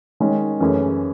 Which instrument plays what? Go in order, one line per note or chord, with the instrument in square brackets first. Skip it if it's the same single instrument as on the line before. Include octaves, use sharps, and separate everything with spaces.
[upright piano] D#3 G#3 C#4
F#2 E3 A3 C#4 G#4